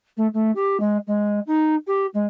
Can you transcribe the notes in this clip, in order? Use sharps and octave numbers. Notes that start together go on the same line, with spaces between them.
A3
A3
G4
G#3
G#3
D#4
G4
G#3